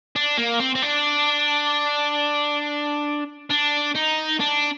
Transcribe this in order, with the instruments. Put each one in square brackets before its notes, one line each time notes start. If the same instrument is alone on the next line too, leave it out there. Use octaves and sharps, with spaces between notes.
[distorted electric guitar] D4
A#3
C4
C4
D4
D4
D#4
D4